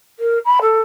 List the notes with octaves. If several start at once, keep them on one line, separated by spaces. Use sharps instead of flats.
A#4
B5
A4